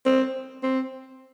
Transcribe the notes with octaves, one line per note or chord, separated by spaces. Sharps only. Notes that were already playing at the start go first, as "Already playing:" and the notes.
C4
C4